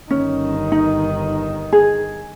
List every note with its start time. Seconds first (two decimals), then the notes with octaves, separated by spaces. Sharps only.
0.11 G1 D#3 C#4
0.72 D#4
1.73 G#4